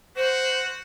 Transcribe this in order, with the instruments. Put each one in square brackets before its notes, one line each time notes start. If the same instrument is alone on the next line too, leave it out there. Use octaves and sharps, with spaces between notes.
[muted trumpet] F#4 [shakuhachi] C5